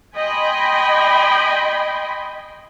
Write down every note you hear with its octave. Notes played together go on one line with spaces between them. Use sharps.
D#5 G5 G#5 B5 C6